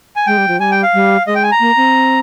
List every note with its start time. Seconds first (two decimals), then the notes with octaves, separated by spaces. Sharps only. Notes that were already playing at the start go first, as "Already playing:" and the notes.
0.16 G#5
0.26 G#3 G5
0.38 G3
0.48 F3
0.59 G3 G#5
0.71 G5
0.83 F5
0.94 G3
1.27 G#3 D#5
1.35 G5
1.43 G#5
1.52 A#5
1.60 A#3
1.77 C4